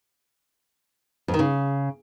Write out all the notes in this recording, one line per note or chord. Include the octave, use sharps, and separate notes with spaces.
F2
D#3
C#3